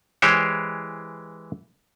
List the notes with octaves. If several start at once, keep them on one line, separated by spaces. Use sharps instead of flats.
E3 G#3 G4 C5 C#5